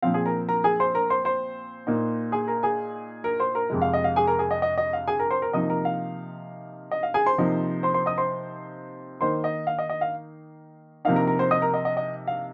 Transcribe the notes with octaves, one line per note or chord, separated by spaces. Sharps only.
A#2 F3 C4 F5
G#4 G#5
A#4 A#5
A#4 A#5
G#4 G#5
C5 C6
A#4 A#5
C5 C6
C5 C6
A#2 A#3 D#4
G#4 G#5
A#4 A#5
G#4 G#5
A#4 A#5
C5 C6
A#4 A#5
F2 C3 G#3
F5
D#5
F5
G#4 G#5
A#4 A#5
G#4 G#5
D#5
D#5
D#5
F5
G#4 G#5
A#4 A#5
C5 C6
A#4 A#5
C3 F3 A#3 D#4 D#5 D#6
A#4 A#5
F5
D#5
F5
G#4 G#5
C5 C6
C3 F3 A#3 D#4
C5 C6
C5 C6
D#5 D#6
C5 C6
D#3 A#3 D#4 C5 C6
D#5
F5
D#5
D#5
F5
C3 F3 A#3 D#4 F5
A#4 A#5
A#4 A#5
C5 C6
D#5 D#6
A#4 A#5
D#5
D#5
D#5
F5